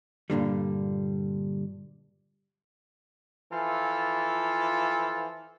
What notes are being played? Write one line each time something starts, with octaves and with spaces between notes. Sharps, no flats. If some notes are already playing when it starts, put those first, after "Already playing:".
G2 A#2 D3 G3
E3 F3 F4 A4